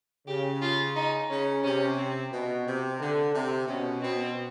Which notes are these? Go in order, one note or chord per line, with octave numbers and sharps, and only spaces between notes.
C#3 G4
F4
D#4
C#3 C#4
C3 C#4
C4
B2
C3
D3
C3
B2 C#4
B2 C4